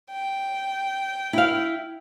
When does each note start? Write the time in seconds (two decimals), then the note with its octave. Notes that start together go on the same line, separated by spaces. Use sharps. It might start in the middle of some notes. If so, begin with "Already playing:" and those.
0.11 G5
1.33 E4 F5